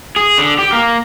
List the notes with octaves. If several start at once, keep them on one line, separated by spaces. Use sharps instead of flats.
G#4
D3
G4
A#3